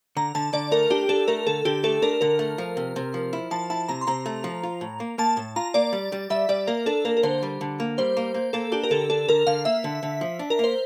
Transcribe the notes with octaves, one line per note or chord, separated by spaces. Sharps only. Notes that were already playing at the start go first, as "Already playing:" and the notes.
D3 A#5
D3 A5
D3 D5
A3 A#4
D4 G4
D4 A4
A3 A#4
D3 A4
D3 G4
A3 A4
D4 A#4
D3 A#4
A3
F3
C3
C3
F3
E4
F3 A5
E4 A5
C3 A#5
C6
C3 A#5
A3
F3
F4
A2
A#3
A#3 A5
A2
F4 A#5
A#3 D5
G3
G3
G3 E5
G3 D5
A#3 A#4
D4 A4
A#3 A#4
A#4
D3 C5
G3
D3
A#3
G3 C5
A#3
A#3
A#3 A4
D4 G4
A#4
D3 A4
D4 A4
D3 A#4
D3 F5
A#3 E5
D3
D3
F3
D4
A#4
A#3 C5